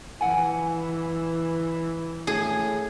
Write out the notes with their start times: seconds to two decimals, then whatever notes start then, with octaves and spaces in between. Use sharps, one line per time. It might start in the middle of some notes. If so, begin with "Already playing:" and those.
0.21 E3 F#5 G#5
2.27 A2 G#4